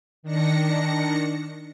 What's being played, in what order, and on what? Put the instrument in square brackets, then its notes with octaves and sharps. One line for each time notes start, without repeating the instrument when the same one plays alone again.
[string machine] D#3 D4 A#6 C#7